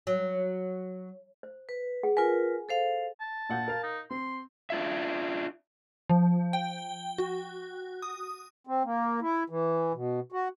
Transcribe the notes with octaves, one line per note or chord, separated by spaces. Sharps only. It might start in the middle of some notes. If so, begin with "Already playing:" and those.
F#3
C5
B4
G#4 F#5
F4 A#4 B4 G#5
A4 C5 F5
A5
A#2 F#5 G6
A#4 F5
D#4
C4 C6
D4 F4 E5
F3
G5
F#4
D#6
C4
A#3
E4
E3
B2
F#4